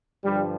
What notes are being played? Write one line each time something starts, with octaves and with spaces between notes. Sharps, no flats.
G2 D3 F3 G3